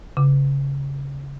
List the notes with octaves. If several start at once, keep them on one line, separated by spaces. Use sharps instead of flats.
C#3